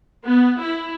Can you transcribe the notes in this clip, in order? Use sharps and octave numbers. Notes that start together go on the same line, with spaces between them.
B3
E4